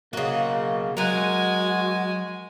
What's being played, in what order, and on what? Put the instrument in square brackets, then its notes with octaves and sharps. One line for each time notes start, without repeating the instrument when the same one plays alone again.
[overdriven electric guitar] B1 D#5 [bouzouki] C#3 F#4 [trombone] A#3
[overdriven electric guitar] F#3 [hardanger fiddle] G#3 G#5 [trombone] F#4 [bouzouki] A#4 F#5